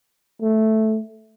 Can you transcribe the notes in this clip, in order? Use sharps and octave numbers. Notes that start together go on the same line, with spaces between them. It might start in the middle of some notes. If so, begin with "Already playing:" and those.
A3